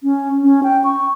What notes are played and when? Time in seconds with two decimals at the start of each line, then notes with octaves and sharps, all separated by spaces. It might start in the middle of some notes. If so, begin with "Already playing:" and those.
0.03 C#4
0.44 C#4
0.63 G5
0.84 C#6